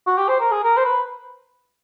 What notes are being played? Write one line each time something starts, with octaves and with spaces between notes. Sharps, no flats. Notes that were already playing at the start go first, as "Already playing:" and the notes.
F#4
G4
C5
A#4
G#4
A#4
C5
B4